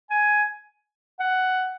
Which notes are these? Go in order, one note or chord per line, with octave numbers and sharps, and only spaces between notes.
G#5
F#5